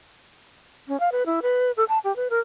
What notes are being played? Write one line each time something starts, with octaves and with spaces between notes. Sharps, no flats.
C#4
F5
B4
E4
B4
A4
A5
G4
B4
A#4